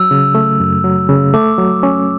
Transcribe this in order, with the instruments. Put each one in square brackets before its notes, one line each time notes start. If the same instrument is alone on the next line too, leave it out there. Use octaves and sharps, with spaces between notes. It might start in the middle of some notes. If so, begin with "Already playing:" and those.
Already playing: [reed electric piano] F#3 [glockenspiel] E6
[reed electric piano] C#3
A3
F#2
F#3
C#3
[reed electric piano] A3 [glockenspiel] D6
[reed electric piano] F#3
C#4